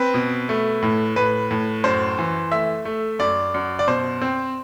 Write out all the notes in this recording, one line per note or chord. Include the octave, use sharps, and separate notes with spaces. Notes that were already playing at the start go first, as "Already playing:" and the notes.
Already playing: C4 B4
B2
A3
A2
A2 B4
A2
F#2 C5
E3
A3 E5
A3
F#2 D5
F#2
D5
B2 C5
C4